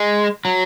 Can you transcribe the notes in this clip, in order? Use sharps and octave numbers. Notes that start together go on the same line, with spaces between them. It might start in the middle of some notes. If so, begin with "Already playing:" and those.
Already playing: G#3
F#3